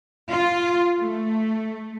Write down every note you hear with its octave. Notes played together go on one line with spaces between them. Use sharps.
F4
A3